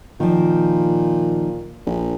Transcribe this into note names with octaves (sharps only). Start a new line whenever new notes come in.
A#2 D#3 F3
A#1